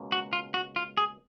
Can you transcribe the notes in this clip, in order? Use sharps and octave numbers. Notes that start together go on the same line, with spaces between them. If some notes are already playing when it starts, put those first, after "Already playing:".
Already playing: C#2 B2 A#3 C#4
F#4
F4
F#4
F4
G#4